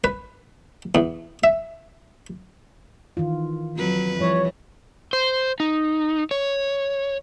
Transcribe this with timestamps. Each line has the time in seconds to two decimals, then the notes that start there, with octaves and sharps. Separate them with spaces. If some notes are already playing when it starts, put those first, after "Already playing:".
0.04 B4
0.95 E2
1.44 E5
3.17 D#3 E3 F4
3.76 F2 F#3 B4
4.20 E3 F3 G3 C#5
5.13 C5
5.60 D#4
6.31 C#5